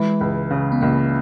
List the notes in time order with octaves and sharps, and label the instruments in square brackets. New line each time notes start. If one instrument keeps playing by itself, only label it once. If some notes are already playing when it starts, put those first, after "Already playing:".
Already playing: [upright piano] E3 [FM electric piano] G#3
[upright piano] C#2
C#3
[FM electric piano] B3
[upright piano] C#2 [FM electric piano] A#3